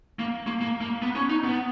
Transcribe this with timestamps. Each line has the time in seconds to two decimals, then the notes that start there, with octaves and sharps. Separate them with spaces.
0.19 A#3
0.47 A#3
0.61 A#3
0.81 A#3
1.02 B3
1.15 C#4
1.29 D#4
1.44 B3